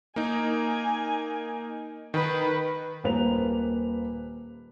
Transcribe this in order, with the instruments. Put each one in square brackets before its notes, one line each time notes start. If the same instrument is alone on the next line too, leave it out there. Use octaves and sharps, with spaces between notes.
[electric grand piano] A#3 D#4 [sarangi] G#5
[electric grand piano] D#3 [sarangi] B4
[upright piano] D#1 A#3 B4 C5 F7